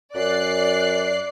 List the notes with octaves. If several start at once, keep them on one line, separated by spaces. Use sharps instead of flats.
F#2 D5 F#6 C7